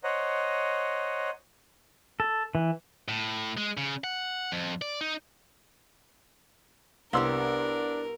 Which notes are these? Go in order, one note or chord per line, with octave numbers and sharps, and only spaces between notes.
C5 C#5 D#5 F#5 A#5
A4
E3
A2
G#3
C#3
F#5
F2
D5
D#4
C2 B3 D4 G4 A#4 C6 E6